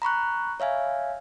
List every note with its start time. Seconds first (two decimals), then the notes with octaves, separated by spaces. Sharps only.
0.02 A#5 B5 C#6 F#6
0.60 C#5 E5 F5 G#5